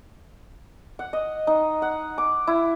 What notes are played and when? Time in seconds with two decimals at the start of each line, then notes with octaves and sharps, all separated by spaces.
0.99 F#5
1.13 D#5
1.47 D#4
1.82 F#5
2.18 D6
2.47 E4